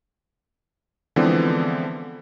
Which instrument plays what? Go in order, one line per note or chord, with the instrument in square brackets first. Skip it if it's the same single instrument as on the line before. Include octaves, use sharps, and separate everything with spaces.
[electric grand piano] D3 E3 F3 G#3 B3 C4